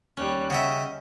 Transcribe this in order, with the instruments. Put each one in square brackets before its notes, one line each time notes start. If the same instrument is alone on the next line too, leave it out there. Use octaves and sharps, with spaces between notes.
[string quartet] D#2 G3 F#6 [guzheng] C#4
[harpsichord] C#3 E5 [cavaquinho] F#4 G5 C#6 [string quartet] D#5